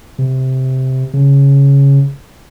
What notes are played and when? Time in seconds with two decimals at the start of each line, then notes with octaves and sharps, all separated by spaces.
0.19 C3
1.14 C#3